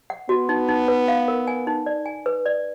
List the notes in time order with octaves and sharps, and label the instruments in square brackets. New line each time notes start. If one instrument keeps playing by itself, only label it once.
[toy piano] F#5
[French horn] B3 [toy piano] F#4
[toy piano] D#4
D#4
B4
F5
A#4
G#5
D#4
D5
G#5
B4
D5